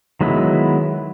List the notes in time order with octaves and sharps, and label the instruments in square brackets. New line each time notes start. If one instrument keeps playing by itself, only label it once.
[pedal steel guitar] D#3 F#3 G#3 B3 E4